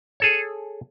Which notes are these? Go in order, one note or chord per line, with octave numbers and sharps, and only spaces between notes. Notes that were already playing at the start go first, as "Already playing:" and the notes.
G#4 A4 C#5